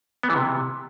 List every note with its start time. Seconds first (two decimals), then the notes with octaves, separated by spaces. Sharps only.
0.23 B3
0.30 E3
0.36 C3